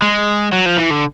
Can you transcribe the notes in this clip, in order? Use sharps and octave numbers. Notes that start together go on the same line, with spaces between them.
G#3
F#3
F3
E3
D3